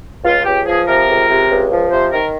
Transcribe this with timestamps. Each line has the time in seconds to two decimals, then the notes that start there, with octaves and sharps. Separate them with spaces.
0.24 C#2 F4
0.45 C#2 G4
0.66 F3 G#4
0.87 C3 A#4
1.07 C#2
1.28 C3
1.50 C#2
1.71 F3
1.92 C3 C5
2.12 D#3 A#4